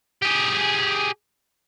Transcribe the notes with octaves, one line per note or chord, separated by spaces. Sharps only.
G4 G#4